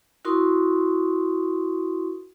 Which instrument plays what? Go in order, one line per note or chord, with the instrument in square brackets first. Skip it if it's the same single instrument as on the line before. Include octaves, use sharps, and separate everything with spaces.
[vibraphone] E4 F#4 A#4 C6 C#6 D#6